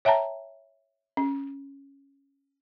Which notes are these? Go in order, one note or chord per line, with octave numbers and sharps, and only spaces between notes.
C#5 E5 G5 A5 A#5
C#4